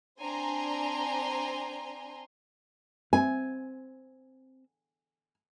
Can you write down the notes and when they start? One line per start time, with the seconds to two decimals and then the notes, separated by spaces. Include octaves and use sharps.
0.19 C4 D4 G#5 A#5 C6
3.13 C4 G#5